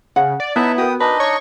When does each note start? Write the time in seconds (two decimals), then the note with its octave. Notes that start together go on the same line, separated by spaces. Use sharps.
0.16 C#3 F#5
0.40 D5
0.56 B3 D#4 E4 B4 C#5 E5 A5 A#5
0.78 F#4 A#4 G5 D#6
1.00 D4 D#4 B4 D#5
1.20 C#5 C#6